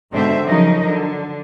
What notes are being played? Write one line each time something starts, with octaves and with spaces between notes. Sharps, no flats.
G#2 B2 D3 C4 C5 E5
C#3 F3 F#3 D#4 A#4 D#5
D3